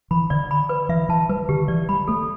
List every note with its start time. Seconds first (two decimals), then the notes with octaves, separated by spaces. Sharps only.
0.11 E3 B5
0.30 D3 D5
0.51 B5
0.69 B4
0.89 E3 E5
1.09 E3 A5
1.29 G3 B4
1.49 D3 G4
1.68 E3 D5
1.89 G3 B5
2.08 A3 A4